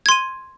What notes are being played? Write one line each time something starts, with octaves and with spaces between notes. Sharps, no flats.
C6 G#6 D#7